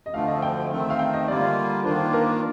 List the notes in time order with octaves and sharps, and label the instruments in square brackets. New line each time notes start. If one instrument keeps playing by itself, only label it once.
[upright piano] D#5
[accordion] D2 D3 F3 A3 [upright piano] F5
[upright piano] D#5
G5
[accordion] D#3 A3 C4
[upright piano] F5
G5
D#5
[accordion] D3 G3 A#3 F4 [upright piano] D5
[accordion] D#3 A#3 D4 F4 [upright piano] C5
[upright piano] A#4